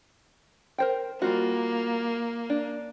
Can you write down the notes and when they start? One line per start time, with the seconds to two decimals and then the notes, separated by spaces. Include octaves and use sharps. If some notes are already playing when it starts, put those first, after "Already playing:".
0.78 A#4 C5 G5
1.22 G3 A#3 F4 F#4
2.50 D4